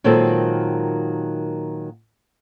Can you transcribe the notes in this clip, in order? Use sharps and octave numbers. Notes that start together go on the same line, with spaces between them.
A#2 D#3 F#3 G#3 C4 A4